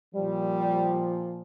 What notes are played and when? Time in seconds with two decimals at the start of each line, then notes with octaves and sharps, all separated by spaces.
0.15 A#2 F3 G3